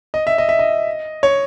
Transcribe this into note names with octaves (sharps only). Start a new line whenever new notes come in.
D#5
E5
D#5
E5
D#5
C#5